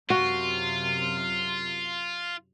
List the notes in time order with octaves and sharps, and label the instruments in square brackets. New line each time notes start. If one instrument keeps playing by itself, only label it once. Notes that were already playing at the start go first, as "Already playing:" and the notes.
[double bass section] F#2 C3 [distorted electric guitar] F4 [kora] F#4